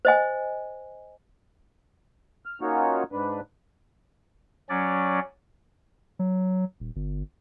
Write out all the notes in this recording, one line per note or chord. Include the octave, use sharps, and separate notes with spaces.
C5 D#5 G#5
F6
A#3 C#4 D#4 F4 F#4 C#5
G#2 D4 B4
F#3 C#4 D5
F#3
D#1
G1